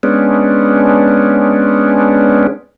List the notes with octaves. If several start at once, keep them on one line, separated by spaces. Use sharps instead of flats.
G#3 B3 C#4 D4